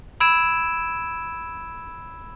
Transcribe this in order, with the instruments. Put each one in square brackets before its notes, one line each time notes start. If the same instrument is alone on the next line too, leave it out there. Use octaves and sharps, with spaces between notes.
[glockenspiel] B5 E6 G#6 D7 E7